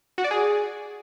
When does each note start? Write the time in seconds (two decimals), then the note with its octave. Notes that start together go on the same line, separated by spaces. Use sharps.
0.18 F#4
0.24 D5
0.31 G#4